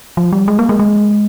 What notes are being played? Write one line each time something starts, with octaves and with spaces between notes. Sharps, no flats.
F3
G3
G#3
A#3
G#3
G#3